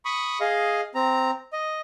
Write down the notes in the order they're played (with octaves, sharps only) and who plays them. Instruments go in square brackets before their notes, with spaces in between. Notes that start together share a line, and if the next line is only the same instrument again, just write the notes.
[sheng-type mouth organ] B5 C#6 D#6
G#4 D#5 F5
C4 A#5
D#5